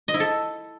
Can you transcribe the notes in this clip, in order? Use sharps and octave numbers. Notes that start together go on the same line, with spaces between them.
D#5
E4
A4